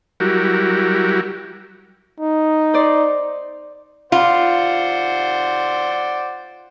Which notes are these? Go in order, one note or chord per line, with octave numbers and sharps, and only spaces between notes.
F#3 G3 E4 F#4 G4 A#4
D#4
C5 D5
F4 C5 D5 F#5